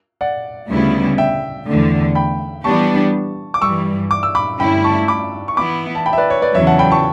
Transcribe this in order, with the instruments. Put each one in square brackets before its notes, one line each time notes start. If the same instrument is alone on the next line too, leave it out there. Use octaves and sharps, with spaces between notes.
[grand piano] D5 F#5
[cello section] D2 C#3 G3 B3 E4
[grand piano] E5 G5
[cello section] E2 D3 A3
[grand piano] G5 B5
[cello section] E3 G3 B3 D4 G4 [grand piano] A5 C#6
[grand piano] D6
[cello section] G2 E3 G3 [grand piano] C#6 E6
[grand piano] D6
E6
B5 D6
[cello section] G2 D3 A3 C#4 E4 [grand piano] G5 B5
[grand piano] A5 C#6
B5 D6
C#6
[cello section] E3 B3 E4 [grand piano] B5 D6
[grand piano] A5
G5 B5
E5
B4 D5
C#5
B4 D5
[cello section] E2 C#3 F#3 [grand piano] C#5 E5
[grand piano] F#5 A5
G5 B5
A5 C#6